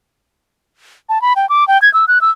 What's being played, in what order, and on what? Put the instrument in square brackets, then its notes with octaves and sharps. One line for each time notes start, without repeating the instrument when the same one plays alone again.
[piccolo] A5
B5
G5
D6
G5
G#6
E6
F#6
E6